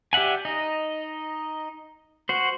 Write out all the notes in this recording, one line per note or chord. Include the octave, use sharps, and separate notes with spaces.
G4 D5 E5 F#5 G#5
D#4 D#5
F#4 C5